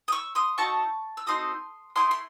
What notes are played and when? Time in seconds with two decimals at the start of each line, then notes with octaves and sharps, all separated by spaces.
0.08 D#6
0.12 C#6 E6
0.35 C6 D#6
0.58 D#4 F#4 A4 A5 C#6
1.17 E6
1.26 C4 D#4 F#4 A4 C6 D#6
1.96 A3 C4 E4 C6 D#6
2.11 C6